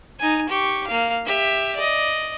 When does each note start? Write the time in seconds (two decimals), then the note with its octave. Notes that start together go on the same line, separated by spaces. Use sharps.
0.19 D#4 G#5
0.49 G4 C#6
0.87 A#3 F5
1.26 G4 E5
1.76 D5 D#5